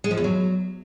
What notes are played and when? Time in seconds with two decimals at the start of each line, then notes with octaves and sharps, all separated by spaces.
0.04 G#3
0.11 F3
0.17 E2
0.24 F#3